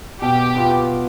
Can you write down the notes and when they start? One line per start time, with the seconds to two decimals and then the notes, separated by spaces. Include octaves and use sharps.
0.22 B2 G4
0.55 B3 F4